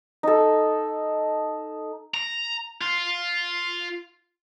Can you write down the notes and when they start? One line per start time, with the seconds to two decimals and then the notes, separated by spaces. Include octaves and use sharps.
0.23 D#4 A4
2.14 A#5
2.82 F4